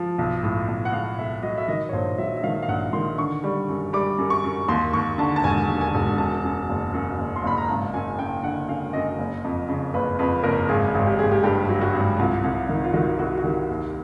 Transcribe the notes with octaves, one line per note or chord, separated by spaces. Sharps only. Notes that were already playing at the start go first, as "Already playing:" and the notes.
Already playing: F3
B1
A2
B1
F#5
B1 F5
B1 E5
F#3 D#5
E5
D#3 D#5
C#5
A#1 C5
F#3 E5
E5
D#3 F5
F5
A#1 F#5
D#3 C6
D3 C#6
G3
F#2
G3 D6
F#2
C#6
F#2
D#2 C6
D#2 C#6
D3 A5
A5
E1 G#5
D#2
G#5
E1
F#2 A5
F#2
F#1
F#2
F#1
C6
F#1 B5
A#5
G#1 A5
F#2 G#5
F#2 G5
D3 F#5
F#2 F5
F#2 D#5
F#1
F2
C#3
F#1 B4
F2 B4
F#1 A#4
G#1 G#4
G#1
G4
G#1 G#4
G4
G2 G4
F#3
F#4
G#1
C2 F4
C2
D#3
F4
D#3 F#4
C2 F#4
F#4
D#3 G4
D#2